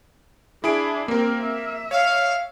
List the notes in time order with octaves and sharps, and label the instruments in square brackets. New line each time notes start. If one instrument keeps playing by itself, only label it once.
[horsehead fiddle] D4 [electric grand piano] E4 G#4 D7
[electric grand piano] A#3 A#4 [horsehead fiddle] C4 G4
[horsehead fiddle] E5
[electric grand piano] C#5 [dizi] F5